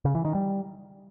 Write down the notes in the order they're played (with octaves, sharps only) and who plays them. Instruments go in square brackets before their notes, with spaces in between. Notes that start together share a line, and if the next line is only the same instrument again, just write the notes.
[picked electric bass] C#3
E3
D#3
G3